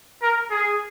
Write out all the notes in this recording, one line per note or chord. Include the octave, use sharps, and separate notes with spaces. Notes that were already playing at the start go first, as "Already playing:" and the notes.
A#4
G#4